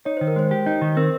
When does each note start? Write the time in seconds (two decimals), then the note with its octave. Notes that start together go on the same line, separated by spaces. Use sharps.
0.05 D#4 C#5
0.17 D#3 C5
0.27 A#4
0.36 G#3 C5
0.51 G4
0.66 D#4
0.82 D#3
0.97 C4 A#4